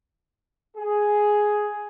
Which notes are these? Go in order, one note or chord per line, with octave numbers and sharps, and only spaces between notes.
G#4